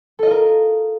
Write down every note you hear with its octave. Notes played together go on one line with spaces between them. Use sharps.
F4 A4 A#4 D#5